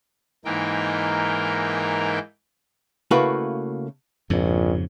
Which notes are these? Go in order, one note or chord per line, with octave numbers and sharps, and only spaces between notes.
G#2 E3 A#3 D#4 A#4 G5
C#3 A3 A#3 E4 F#4 B4
A#1 F2 G#2 C#3